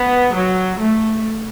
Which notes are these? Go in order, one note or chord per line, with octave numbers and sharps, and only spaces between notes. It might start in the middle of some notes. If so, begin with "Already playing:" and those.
Already playing: B3
F#3
A3